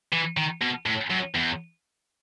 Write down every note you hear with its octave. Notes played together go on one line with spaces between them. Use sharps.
E3
D#3
B2
A2
F#2
E2